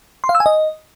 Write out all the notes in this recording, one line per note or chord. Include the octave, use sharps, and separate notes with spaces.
C6
F5
E6
G#5
D#5